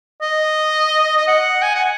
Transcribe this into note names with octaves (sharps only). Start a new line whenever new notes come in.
D#5
D#5
F#5
G#5
F#5